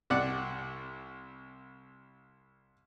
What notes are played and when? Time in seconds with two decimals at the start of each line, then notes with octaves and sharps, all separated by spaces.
0.10 C2 D5 F#5